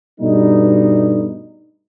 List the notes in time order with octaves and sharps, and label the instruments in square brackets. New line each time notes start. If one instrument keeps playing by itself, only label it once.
[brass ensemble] G2 B2 G3 A3 D#4